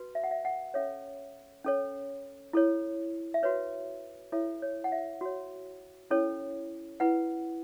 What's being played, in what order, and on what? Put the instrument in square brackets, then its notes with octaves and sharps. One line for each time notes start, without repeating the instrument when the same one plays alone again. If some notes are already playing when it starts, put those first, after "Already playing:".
Already playing: [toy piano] F#4 B4
E5
F#5
E5
F#5
C#4 A4 C#5 E5
C#4 A4 C#5
E4 A4 C#5
E5
F#4 B4 C#5
E4 A4 C#5 E5
C#5
F#5
E5
F#4 C#5
C#4 E4 A4 C#5
E4 B4 F#5